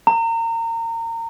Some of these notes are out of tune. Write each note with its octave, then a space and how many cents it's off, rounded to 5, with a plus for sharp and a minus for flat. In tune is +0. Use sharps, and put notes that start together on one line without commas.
A#5 -30